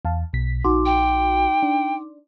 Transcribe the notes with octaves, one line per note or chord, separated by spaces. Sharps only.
E2 F5 A5
B1 B2 B6
A#1 D#4 F#4 C6 D6
G5
D4